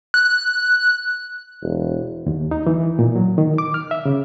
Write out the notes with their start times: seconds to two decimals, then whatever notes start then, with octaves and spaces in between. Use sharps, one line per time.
0.14 F#6
1.63 E1
2.26 D#2
2.51 D#4
2.67 E3
2.99 A#2
3.16 F#3
3.38 D#3
3.58 D6
3.74 F6
3.91 E5
4.05 C#3